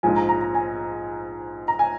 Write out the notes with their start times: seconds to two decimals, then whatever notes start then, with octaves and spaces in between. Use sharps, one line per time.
0.03 A#1 G#2 F3 G#5
0.16 A#5
0.29 A#5
0.41 A#5
0.54 G#5
1.68 A#5
1.79 G#5